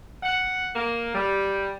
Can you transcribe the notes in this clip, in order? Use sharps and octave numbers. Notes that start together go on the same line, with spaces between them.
F#5
A#3
G3